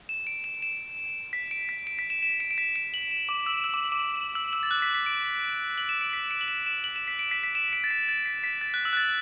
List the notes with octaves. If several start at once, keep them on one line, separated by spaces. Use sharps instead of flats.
E7
D7
E7
E7
B6
D7
B6
D7
B6
E7
E7
D7
D7
B6
D7
F#7
E7
D6
E6
E6
D6
D6
E6
E6
A6
F#6
B6
B6
D7
F#7
E7
D7
B6
D7
F#7
E7
E7
F#7
E7
B6
D7
B6
B6
E7
D7
A6
B6
A6
B6
B6
A6
F#6
E6
F#6
A6